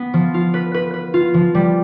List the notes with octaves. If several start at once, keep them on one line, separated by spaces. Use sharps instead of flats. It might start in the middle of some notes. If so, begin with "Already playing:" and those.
Already playing: B3
F3
F4
B4
B4
B4
F4
F3
G3